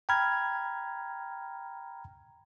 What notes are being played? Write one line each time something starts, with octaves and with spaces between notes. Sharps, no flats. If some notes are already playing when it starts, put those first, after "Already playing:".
G5 A#5 B5 F6 G#6